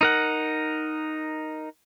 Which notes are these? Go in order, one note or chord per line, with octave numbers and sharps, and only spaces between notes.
D#4 A#4 F#5